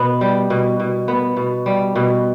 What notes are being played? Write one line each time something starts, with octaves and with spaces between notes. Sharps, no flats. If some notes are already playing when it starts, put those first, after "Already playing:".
Already playing: B2 B3
G3
B2
B2
B3
B2
G3
B2